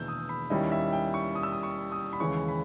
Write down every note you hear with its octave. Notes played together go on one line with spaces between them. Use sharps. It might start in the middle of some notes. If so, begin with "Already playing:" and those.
Already playing: E1 E2 D#3 A#3 E4 E6 G6
D#6
B5
D#2 D#3 G3 C#4 E4 D#5
E5
G5
C#6
D#6
E6
D#6
C#6
D#6
B5
D#2 C#3 E3 G#3 C#4 C#6
B5